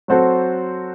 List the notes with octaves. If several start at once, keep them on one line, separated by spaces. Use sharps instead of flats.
F#3 C4 F#4 A4 C5